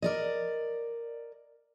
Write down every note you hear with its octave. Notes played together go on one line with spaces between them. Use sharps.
A#4 D5 D#5